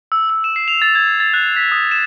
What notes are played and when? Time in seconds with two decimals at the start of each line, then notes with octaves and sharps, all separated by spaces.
0.12 E6
0.29 E6
0.44 E7
0.56 C7
0.68 F7
0.82 A6
0.95 G#6
1.20 A6
1.34 F#6
1.56 B6
1.72 D#6
1.91 E7